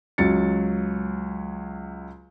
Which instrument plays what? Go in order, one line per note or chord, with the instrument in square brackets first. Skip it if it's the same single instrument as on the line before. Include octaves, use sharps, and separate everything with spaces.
[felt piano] C#2 F#3 A6 C#7